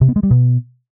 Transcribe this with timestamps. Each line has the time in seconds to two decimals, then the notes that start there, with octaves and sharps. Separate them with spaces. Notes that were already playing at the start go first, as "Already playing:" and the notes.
0.01 C3
0.09 B3
0.16 G#3
0.23 G3
0.31 B2